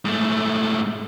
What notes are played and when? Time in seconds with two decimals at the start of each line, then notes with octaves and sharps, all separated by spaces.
0.05 G#2 A3